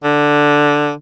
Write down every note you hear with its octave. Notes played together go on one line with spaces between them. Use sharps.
D3